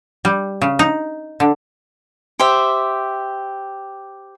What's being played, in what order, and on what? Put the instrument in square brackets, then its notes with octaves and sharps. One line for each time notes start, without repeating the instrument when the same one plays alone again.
[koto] G3
C#3
D#4
D3
[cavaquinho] G4 C5 E5